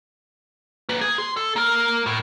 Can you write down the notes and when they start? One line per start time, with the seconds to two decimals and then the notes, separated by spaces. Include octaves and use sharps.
0.89 A#3 B4
1.01 G#4
1.18 C6
1.37 A4
1.56 A#3 A#4
2.06 A2